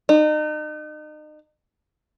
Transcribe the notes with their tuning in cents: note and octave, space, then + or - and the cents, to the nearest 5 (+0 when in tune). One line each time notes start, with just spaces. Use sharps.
D#4 -35